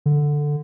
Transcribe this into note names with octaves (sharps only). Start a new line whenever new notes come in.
D3